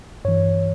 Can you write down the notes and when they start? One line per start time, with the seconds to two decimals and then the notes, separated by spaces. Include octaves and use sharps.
0.25 G2 E3 C#5